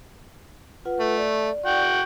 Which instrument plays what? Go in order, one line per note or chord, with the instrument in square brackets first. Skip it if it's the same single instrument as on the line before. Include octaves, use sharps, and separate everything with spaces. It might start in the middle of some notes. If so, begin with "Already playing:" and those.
[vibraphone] F4 B4 F#5
[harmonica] A3
[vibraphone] D5
[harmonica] F#4 G5